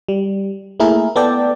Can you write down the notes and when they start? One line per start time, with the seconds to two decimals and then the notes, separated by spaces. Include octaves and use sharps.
0.08 G3
0.80 A3 A#3 E4 G#4 A#4
1.16 B3 A4 D5 G5 A5